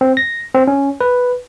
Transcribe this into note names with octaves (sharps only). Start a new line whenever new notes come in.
C4
A#6
C4
C#4
B4